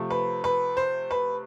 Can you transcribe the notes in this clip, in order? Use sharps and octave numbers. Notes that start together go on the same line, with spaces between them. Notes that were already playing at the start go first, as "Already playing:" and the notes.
Already playing: C3 F3 A3
B4
B4
C5
B4